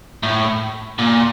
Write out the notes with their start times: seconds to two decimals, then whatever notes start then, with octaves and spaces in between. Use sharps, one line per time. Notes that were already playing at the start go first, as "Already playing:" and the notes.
0.23 A2
0.99 A#2